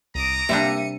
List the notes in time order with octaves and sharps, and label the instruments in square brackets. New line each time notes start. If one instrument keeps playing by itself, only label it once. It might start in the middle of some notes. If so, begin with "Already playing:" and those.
[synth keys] C2 [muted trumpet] A#5 [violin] D6 D#6
[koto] C3 G3 D4 [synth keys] A#3 E5 [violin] C#7 D#7